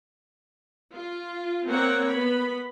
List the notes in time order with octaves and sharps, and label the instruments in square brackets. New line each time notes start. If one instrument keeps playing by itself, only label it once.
[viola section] F4
A#3 C4 C#5 F#5
B3 B5